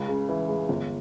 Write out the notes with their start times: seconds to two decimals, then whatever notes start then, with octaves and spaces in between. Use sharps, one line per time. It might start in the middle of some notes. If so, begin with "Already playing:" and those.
Already playing: C#2
0.08 C#3
0.29 E3
0.49 G#3
0.69 G1